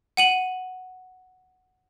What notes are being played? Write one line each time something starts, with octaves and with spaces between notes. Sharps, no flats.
F#5 D#7 F#7